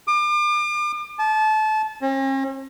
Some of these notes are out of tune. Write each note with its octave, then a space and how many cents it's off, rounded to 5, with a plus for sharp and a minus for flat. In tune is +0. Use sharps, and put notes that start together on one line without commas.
D6 +40
A5 -25
C#4 -45